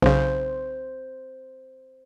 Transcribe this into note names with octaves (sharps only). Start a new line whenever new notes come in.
B1 C#3 C5